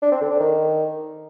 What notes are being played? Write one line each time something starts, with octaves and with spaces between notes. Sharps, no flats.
D4
C4
D3
D4
D#3